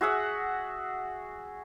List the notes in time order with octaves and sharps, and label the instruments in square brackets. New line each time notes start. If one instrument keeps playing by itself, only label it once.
[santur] F#4 G#4 E5 F#5